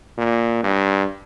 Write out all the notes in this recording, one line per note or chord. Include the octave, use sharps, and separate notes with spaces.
A#2
G2